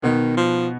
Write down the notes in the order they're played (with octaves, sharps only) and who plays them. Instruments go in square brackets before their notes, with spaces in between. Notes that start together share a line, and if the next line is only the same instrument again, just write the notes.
[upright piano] B2 B3 D#4 [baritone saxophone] D#3
[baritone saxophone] F3